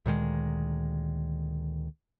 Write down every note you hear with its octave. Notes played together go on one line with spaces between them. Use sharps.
D2 A#2 D#3 G#3